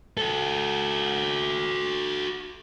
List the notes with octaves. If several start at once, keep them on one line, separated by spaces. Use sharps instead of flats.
F#4 A4